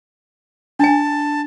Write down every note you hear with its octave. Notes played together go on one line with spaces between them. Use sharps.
D4 G#5 A5